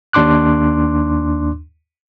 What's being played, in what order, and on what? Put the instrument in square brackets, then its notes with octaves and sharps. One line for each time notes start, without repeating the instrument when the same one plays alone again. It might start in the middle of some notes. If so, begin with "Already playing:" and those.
[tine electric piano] D#2 D4 C6 D6 F#6